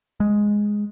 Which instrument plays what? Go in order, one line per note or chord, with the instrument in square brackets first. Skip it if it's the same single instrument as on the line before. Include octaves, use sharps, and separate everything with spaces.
[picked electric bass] G#3